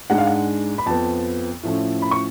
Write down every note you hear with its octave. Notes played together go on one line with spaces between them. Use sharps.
G#2 G#3 D4 F#5
F5
F#5
B5
F2 F3 B3 A5
A2 F3 A3 C#4
B5
C#6